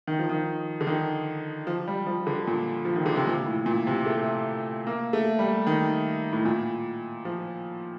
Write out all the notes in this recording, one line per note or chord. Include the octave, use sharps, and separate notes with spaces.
D#3
F3
D#3
D3
D#3
F3
G3
F3
D3
A#2
F3
D#3
D3
C3
A#2
A2
A#2
C3
A3
A#3
A3
G3
D#3
A2
A#2
F3